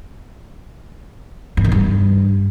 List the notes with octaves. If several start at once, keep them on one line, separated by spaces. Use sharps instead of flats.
G2
D#3
G2